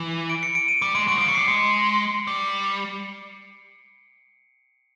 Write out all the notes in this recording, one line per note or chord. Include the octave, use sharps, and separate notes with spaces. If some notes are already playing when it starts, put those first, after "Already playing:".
Already playing: E3
D7
C#7
D7
D#7
G3 D7
G#3 D7
F#3 D7
F3
D7
F#3 C#7
G3 C7
G#3 C#7
G3